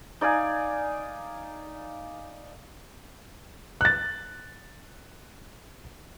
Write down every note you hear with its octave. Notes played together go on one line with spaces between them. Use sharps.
D#4 D5 F5 G#5
F#6 A6